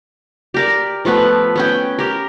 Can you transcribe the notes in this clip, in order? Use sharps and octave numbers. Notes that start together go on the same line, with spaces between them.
G4 A#4 D5
F3 A3 B3 B4
B3 C#4 G5
G4 A#4